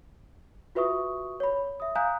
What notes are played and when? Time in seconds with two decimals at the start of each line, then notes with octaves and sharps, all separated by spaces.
0.75 F4 F#4 B4 E5 C#6 D#6
1.40 C#5 B5
1.80 E5 D#6
1.95 F5 G#5 A#5 D#6 F#6 G6